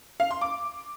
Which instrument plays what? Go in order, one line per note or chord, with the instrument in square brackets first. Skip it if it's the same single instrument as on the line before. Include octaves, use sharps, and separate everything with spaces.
[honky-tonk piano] F5
C6
D6